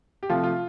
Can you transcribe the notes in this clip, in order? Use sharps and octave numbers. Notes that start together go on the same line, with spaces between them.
G4
C3 F3 A3 F4
F4